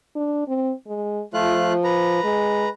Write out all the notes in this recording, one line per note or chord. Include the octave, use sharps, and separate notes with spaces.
D4
C4
G#3
F3 A3 F4 F#6
B4 A#5
G#3